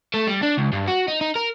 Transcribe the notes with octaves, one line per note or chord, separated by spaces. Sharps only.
A3
G3
D4
C#2
G2
F#4
D#4
D#4
A#4